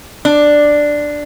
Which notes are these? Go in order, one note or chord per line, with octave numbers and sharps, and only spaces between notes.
D4